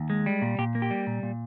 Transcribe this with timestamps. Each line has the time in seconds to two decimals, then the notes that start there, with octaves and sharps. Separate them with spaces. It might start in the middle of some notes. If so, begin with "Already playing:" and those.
Already playing: D#2
0.10 G#3
0.26 G3
0.42 A#2
0.58 A#2 G4
0.75 A#3
0.82 G4
0.91 G3
1.07 A#2
1.23 A#2